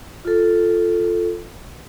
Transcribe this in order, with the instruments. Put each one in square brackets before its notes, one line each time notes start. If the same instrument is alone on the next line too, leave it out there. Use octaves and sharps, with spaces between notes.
[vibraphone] F4 A4